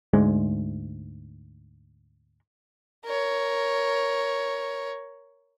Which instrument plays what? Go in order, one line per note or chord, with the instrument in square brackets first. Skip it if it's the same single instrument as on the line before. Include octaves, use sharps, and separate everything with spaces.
[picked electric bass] D2 G#2 G#3
[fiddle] A#4 C#5